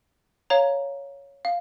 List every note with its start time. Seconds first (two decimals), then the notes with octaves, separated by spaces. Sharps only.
0.50 C#5 F5 A#5
1.45 F5